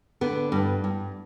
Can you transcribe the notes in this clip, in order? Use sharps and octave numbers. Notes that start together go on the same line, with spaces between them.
D3 B3
G2
G2